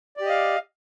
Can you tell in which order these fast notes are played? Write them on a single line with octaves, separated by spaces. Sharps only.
D5 G4 D#5 F5